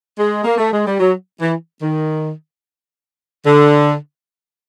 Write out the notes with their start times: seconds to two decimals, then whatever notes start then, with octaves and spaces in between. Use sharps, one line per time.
0.18 G#3
0.44 A#3
0.58 A3
0.72 G#3
0.86 G3
1.00 F#3
1.41 E3
1.82 D#3
3.45 D3